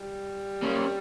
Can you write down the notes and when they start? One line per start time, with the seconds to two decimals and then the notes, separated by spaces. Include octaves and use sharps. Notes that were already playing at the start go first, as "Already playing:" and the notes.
Already playing: G3
0.62 A#3 C#4